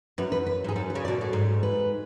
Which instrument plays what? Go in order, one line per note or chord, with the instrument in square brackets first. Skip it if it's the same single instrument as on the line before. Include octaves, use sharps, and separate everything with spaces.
[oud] F#2 [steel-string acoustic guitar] B4
[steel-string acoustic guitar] B4
B4
[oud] G#2 [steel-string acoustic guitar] G#4
[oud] F#2 [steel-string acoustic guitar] A4
[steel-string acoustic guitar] B4
[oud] C#3
[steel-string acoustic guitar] D5
[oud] B2
A2
G#2
[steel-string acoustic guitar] B4